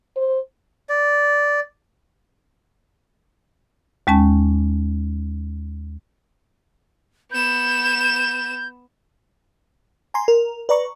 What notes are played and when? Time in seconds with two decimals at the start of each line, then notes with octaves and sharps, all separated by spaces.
0.16 C5
0.89 D5
4.07 D#2 G#3 C#4 A5
7.31 B3 G6 E7
10.14 G#5 A#5 C6
10.28 A#4
10.69 B4 D5 A#5 C#6